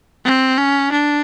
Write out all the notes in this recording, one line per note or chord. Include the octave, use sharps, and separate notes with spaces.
C4
C#4
D4